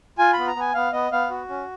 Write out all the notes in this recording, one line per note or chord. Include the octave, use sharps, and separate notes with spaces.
F4 G#5
B5
B3
A#5
B3 G#5
B3 F5
B3 D#5
B3 F5
F#4
C#4